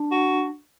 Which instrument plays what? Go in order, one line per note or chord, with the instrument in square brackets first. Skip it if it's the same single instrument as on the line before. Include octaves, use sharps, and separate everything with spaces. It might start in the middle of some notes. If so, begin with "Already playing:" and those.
Already playing: [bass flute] D4
[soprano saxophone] F#4